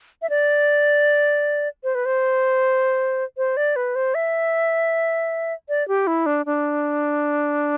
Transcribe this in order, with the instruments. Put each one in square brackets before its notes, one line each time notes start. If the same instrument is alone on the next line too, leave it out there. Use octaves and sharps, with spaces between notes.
[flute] E5
D5
C5
B4
C5
C5
D5
B4
C5
E5
D5
G4
E4
D4
D4